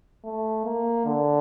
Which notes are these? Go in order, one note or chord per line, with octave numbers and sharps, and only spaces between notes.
A3
A#3
D3